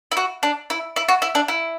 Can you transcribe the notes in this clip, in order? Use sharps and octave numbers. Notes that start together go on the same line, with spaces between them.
E4
F#4
D4
E4
E4
F#4
E4
D4
E4